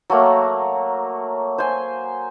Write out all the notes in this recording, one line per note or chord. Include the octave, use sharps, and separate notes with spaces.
F#3 A3 A#3 C#5 A#5 C#6
C5 G#5